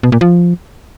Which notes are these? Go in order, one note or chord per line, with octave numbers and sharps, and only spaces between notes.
B2
A#2
F3